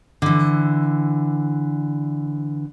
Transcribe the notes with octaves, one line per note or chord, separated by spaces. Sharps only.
D3 E3